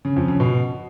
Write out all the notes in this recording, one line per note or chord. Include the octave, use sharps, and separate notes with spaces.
C#3
F2
C#3
B2